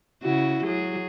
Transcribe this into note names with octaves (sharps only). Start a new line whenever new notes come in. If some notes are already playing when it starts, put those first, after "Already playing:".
C#3 E4 F#4
F#3 G#4